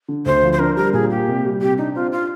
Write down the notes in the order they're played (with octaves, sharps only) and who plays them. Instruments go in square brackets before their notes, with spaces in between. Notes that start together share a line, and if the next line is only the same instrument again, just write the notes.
[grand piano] D3
[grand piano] D2 [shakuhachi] C5
[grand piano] F3
[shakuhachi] C5
[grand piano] D4 [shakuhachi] A#4
[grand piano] G3 [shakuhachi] A#4
[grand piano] A#2 [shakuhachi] G#4
[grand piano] A#3 [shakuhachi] G4
[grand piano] C3
G3
[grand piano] C3 [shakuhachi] G4
[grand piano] D4 [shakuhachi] D#4
[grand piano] C4 [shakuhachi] F4
[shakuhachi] F4